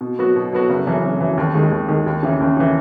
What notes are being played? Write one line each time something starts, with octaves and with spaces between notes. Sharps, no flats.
B2
F#3 B3 F#4
B2
F#3 B3 F#4
F#1
F#2 E3
F#1
F#2 E3
D#2
D#3 G#3
D#2
D#3 G#3
D#2
C#3 E3
D#2
C#3 E3